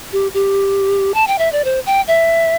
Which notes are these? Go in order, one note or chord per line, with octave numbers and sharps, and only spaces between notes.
G4
G4
A5
G5
E5
D5
C5
G5
E5